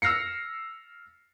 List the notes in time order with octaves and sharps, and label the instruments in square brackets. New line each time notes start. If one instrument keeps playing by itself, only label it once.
[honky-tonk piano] E6 F6 A#6 C7 C#7